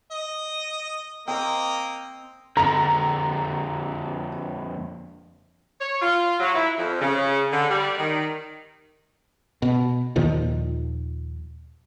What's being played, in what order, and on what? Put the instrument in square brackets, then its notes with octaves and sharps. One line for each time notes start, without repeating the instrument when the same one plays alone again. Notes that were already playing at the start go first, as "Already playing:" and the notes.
[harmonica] D#5
[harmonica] A#3 D#5 [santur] C4 D#6
[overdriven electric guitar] F2 D3 [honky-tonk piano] A#5
[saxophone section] C#5
F4
F#3
E4
F2
C#3
D3
G3
D#3
[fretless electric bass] B2
D#2 A#2 D#3 F3